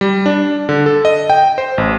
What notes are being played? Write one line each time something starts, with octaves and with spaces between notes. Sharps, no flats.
G3
D4
D3
A4
D#5
G5
C5
A1